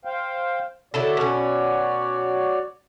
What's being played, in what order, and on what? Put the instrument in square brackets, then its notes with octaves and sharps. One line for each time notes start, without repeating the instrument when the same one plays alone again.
[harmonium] C5 F5 G5
[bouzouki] D3 E4 A4 [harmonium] F#4 C#5 D5
[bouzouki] B2 C#4